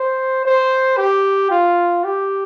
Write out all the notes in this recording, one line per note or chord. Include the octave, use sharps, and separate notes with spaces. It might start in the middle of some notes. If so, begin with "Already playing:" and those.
Already playing: C5
C5
G4
F4
G4